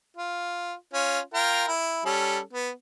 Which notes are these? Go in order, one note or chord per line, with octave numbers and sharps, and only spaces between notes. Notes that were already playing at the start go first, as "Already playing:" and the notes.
F4
C#4 F4
F4 A#4 G5
E4
G3 C#4 A4
B3